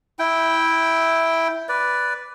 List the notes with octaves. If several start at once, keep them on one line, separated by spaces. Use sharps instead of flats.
E4 G5
B4 D5